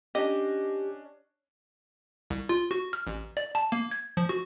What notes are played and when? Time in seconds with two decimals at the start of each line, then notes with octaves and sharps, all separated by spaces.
0.15 C#4 D4 G4 D#5
2.30 C2
2.49 F4
2.71 F#4
2.93 F6
3.07 A1
3.37 D5
3.55 A5
3.72 A#3
3.91 G#6
4.17 F3
4.29 F#4